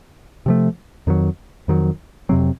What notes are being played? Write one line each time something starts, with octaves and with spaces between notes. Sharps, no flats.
C3 F3 A3
F2 D#3 F#3
F2 D#3 F#3
F2 C3 F#3 C4